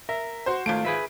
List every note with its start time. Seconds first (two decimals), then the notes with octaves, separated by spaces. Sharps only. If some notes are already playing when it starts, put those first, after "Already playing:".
0.09 A#4 E5
0.46 F#4 C5
0.66 G#1 A3 F4 D7
0.85 G#4 B4 E5